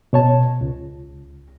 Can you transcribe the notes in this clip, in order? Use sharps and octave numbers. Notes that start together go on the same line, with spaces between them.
B2 C#5 A5
C#2